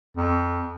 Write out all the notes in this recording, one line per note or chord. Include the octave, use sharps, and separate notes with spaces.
F2